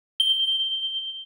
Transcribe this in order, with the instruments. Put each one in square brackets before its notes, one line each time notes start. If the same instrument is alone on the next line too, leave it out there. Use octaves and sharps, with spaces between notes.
[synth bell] G7